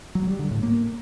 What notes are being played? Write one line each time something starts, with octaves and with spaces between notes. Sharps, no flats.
F#3
G3
D3
A2
A#3